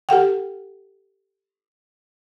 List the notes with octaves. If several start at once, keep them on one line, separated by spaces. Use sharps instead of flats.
G4 A4 F#5 G5